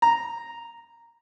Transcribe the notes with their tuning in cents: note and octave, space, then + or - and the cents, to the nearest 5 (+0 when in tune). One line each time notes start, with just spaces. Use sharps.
A#5 -5